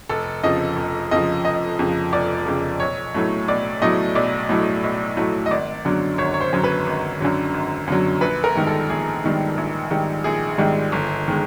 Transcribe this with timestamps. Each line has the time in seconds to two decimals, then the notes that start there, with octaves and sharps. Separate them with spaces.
0.09 F1 A4
0.44 F2 C#3 F3 D#5
0.77 F1
1.11 F2 C#3 F3 D#5
1.45 F1 D#5
1.79 F2 C#3 F3
2.13 F1 D5
2.46 F2 C#3 F3
2.80 B1 C#5
3.14 A2 F#3 A3
3.48 B1 D5
3.82 A2 F#3 A3 D#5
4.15 B1 D5
4.49 A2 F#3 A3
4.84 B1
5.17 A2 F#3 A3
5.46 D#5
5.51 G#1 D5
5.85 F#2 D3 F#3
6.18 G#1 C#5
6.34 C#5
6.41 C5
6.53 F#2 D3 F#3
6.64 B4
6.87 G#1
7.20 F#2 D3 F#3
7.54 G#1
7.87 F#2 D3 F#3
8.21 A#1 B4
8.44 A#4
8.55 G#2 D#3 G3
8.67 A4
8.90 A#1 G#4
9.24 G#2 D#3 G3
9.57 A#1
9.90 G#2 D#3 G3
10.24 A#1 G#4
10.58 G#2 D#3 G3
10.92 G1
11.28 D#3 G#3